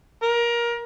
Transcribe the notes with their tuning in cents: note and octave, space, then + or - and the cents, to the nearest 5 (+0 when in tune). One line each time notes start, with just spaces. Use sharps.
A#4 +20